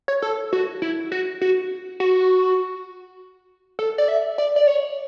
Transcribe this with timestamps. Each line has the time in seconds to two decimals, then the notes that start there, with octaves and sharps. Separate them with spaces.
0.08 C#5
0.22 A4
0.53 F#4
0.82 E4
1.12 F#4
1.42 F#4
2.00 F#4
3.79 A4
3.98 D5
4.08 E5
4.38 D5
4.56 D5
4.67 C#5